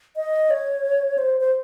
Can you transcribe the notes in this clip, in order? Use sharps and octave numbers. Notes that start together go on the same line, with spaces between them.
D#5
C#5
C5
C5